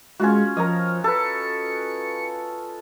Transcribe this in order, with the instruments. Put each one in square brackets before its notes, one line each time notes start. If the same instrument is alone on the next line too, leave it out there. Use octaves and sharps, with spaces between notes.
[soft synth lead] G#3 [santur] C#4 F4 F#4
[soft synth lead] F3 [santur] A#4 C#5 D#5
[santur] A4 B4 [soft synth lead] C#7